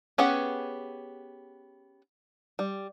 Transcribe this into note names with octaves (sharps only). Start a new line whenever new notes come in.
B3 C#4 G4 G#4 F#5
G3